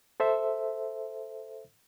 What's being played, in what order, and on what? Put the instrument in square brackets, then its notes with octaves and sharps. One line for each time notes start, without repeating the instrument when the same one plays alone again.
[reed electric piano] A4 C5 E5